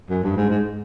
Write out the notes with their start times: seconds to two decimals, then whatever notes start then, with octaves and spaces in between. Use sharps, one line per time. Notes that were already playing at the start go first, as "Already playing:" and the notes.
0.10 F#2
0.23 G2
0.37 G#2
0.50 G#2